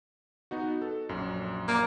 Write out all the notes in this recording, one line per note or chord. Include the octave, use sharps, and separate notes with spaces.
B3 D#4 F#4
A4
A#1 F#2
A#3